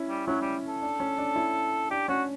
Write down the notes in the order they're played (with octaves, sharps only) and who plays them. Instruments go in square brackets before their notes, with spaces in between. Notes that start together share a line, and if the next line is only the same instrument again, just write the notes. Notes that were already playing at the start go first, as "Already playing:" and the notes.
Already playing: [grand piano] C#4 E4
[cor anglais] G3
[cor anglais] F#3 [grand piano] C#4 E4
[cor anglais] G3
A4
[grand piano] D4
C#4
D4
C#4 E4
[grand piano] D4 [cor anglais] G4
[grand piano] C#4 [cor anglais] F#4